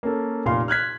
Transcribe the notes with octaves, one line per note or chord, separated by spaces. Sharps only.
A#3 C#4 A4
F1 A#2 F5 C6
F6 F#6 G#6 B6